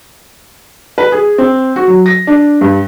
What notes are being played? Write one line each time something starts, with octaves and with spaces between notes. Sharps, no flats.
B4
G#4
C4
F#4
F#3
A#6
D4
G2